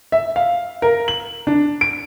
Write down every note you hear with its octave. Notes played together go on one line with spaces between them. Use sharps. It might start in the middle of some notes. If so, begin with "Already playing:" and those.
E5
F5
A#4
F#7
D4
D7